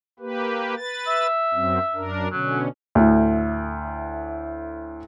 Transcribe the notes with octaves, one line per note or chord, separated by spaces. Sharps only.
A#3 G4 B4
B4 A6
E5
F#2 F#3 C4
F#2 D4 A#4
B2 D3 F#3 C#4
D2 A2